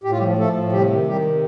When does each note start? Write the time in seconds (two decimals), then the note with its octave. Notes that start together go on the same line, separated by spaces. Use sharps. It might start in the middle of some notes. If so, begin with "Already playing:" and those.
0.04 A2 G4
0.11 F4
0.18 G3 G4
0.21 F3
0.38 F3 A3 A4
0.56 A2
0.72 C3 G3 G4
0.90 D#3
1.06 D#3 G3 G4
1.25 C3